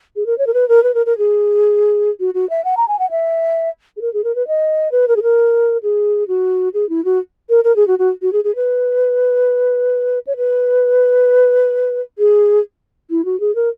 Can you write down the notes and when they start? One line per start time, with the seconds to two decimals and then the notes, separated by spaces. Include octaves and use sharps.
0.16 G#4
0.26 A#4
0.38 C#5
0.47 A#4
0.54 B4
0.69 A#4
0.83 B4
0.94 A#4
1.06 A#4
1.18 G#4
2.20 F#4
2.34 F#4
2.50 E5
2.65 F#5
2.77 A#5
2.88 G#5
2.99 F#5
3.11 E5
3.97 G#4
4.01 A#4
4.13 G#4
4.24 A#4
4.35 B4
4.48 D#5
4.92 B4
5.08 A#4
5.16 G#4
5.23 A#4
5.83 G#4
6.28 F#4
6.74 G#4
6.89 E4
7.05 F#4
7.49 A#4
7.64 A#4
7.76 G#4
7.87 F#4
7.99 F#4
8.22 F#4
8.33 G#4
8.44 G#4
8.56 B4
10.27 C#5
10.37 B4
12.18 G#4
13.10 E4
13.25 F#4
13.40 G#4
13.55 A#4